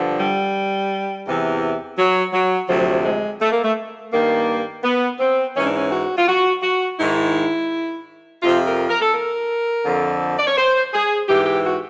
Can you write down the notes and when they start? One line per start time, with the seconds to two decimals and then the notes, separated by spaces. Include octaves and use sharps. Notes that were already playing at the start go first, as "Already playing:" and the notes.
Already playing: G2 D3 F3
0.19 G3
1.26 E2 C3 E3
1.98 F#3
2.33 F#3
2.69 D2 C3 F3 F#3
3.04 G#3
3.41 A3
3.52 A#3
3.63 A3
4.12 G2 D#3 A#3
4.83 B3
5.19 C4
5.55 G#2 E3 C#4
5.66 D4
5.76 C#4
5.91 F#4
6.17 F4
6.27 F#4
6.62 F#4
6.99 G#2 D#3 E4
8.42 F2 C3 F3 F4
8.66 A#4
8.89 A#4
9.01 A4
9.13 A#4
9.85 F2 D3 F3
10.39 D5
10.47 C#5
10.57 C5
10.93 G#4
11.28 G#2 E3 G4
11.46 G4
11.64 F#4